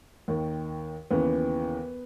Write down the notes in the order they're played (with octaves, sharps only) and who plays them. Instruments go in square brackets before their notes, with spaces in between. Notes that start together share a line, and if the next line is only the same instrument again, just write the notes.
[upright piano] D#2 D#3
D#2 C#3 E3 B3